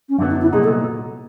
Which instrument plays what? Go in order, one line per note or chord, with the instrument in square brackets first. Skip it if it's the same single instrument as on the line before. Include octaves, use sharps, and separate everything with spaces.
[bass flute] C#4
[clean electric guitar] F#2 D3 F#3 B3 [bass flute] D4
[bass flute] D#4
E4
[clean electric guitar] C2 A#2 F#3 B3 D#4 [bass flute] G#4
[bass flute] A4